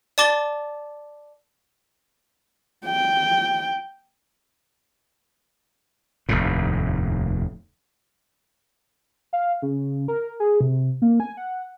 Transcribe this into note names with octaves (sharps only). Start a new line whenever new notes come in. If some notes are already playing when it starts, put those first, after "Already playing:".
D5 A5 D6 A6 G7
G5
F1 D#2 A2
F5
C#3
A#4
G#4
C3
A#3
G#5
F#5